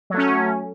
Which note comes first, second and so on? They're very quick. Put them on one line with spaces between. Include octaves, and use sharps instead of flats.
F#3 A3 C#4